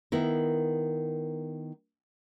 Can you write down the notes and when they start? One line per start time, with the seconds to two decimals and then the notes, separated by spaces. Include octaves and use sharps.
0.12 D#3 B3 E4 A#4